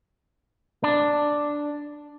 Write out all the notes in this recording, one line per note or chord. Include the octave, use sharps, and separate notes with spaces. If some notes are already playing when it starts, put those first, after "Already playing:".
D4